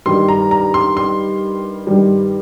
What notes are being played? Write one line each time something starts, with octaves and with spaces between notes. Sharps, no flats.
G2 D#3 G3 C6
A#5
A#5
C6
C6
G2 D#3 G3